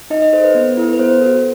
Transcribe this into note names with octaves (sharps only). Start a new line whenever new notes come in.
D#4 D#5
D#5
A4 C5
B4
B3
E4 A4
B4
B3 C5
F#4 A4